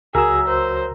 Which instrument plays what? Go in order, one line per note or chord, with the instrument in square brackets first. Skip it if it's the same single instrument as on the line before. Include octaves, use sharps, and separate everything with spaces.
[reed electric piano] C#2 F#4 E6 [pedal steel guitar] F#3 E5 [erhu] G#4 [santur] A#4
[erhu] C5